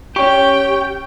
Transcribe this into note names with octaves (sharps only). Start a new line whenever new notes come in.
C#4 G4 G5 C#6